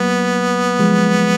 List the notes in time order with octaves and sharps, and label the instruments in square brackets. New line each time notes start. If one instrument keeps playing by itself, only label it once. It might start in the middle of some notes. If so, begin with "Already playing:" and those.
Already playing: [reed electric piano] F#3 A#3 [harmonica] B3
[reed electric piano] F3 G#3